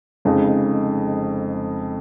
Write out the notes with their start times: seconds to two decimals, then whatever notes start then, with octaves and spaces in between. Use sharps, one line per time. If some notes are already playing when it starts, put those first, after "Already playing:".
0.25 F1 F2 C#3 G#3 D#4